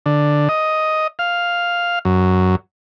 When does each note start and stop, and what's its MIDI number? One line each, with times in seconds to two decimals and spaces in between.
0.06 0.48 50
0.49 1.07 75
1.19 1.99 77
2.05 2.56 42